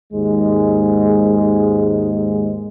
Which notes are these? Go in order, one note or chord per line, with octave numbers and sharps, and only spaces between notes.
D#2 G#2 G#3